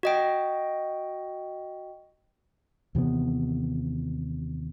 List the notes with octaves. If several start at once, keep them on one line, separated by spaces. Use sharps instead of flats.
F#4 D#5 G5
D#2 C3 E3 B3